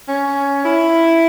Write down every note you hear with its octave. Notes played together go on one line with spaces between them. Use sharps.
C#4
E4